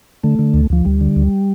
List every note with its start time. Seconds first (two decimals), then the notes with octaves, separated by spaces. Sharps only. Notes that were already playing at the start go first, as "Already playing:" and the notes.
0.23 D3 A3
0.39 D3
0.54 D2
0.70 D2 F3
0.85 D2 G3
1.01 D3
1.16 D2